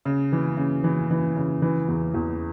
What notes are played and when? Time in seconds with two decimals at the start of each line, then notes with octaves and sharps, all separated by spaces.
0.05 C#3
0.32 E3
0.57 C#3
0.84 E3
1.11 E3
1.37 C#3
1.62 E3
1.89 E2
2.14 E2